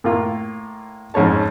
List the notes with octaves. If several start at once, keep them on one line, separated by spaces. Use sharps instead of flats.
A2 A#3 F4
F2 G#2 C#4 C#5 A5